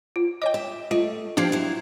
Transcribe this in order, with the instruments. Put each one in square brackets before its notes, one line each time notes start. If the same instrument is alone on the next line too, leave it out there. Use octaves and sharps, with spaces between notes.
[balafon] F4
[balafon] C#5 D#5 [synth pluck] G5 D6
[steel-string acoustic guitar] E5
[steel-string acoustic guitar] A3 [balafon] F4 [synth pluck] D#5
[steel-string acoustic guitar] F3 C4 G4 [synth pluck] D4 G#6 C7
[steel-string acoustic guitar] F#3 E4